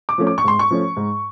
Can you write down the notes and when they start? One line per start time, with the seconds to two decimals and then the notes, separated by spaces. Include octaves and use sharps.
0.09 D6
0.18 F3 A3 C#4
0.27 D6
0.38 C#6
0.44 G#2 C6
0.59 C#6
0.71 F3 A3 C#4
0.97 G#2